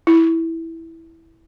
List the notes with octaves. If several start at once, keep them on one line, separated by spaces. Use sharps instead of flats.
E4